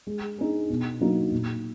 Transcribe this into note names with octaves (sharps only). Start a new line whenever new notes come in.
G#3
D#4 G#4
B2
F#3 A#3 D#4 F#4
A#2